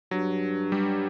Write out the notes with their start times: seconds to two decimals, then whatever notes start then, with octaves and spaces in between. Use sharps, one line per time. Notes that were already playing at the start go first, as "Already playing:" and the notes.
0.11 G2 F#3
0.72 G3